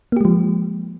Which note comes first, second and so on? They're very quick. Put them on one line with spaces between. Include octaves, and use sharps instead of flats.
A#3 G4 G#3 F3